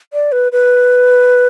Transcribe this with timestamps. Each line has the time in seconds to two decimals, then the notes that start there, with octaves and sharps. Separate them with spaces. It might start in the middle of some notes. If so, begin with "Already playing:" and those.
0.13 D5
0.32 B4
0.52 B4